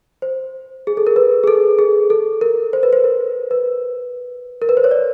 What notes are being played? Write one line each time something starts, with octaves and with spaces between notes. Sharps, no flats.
C5
G#4
A4
A#4
B4
G#4
A4
G#4
A4
A#4
C5
B4
C5
A#4
B4
A#4
B4
C5
C#5
D5